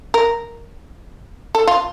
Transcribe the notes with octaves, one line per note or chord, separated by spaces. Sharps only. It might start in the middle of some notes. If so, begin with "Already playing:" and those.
A#4
A4
F4